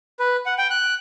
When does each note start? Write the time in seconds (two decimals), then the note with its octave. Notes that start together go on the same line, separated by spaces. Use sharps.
0.20 B4
0.46 F#5
0.58 G5
0.71 F#6